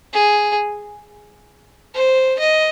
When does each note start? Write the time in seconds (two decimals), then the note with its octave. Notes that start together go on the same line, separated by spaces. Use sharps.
0.13 G#4
1.94 C5
2.39 D#5